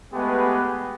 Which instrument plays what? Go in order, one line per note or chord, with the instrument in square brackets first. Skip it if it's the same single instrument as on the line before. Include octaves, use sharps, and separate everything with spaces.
[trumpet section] G#3 A3 B3 G4 G#4 B4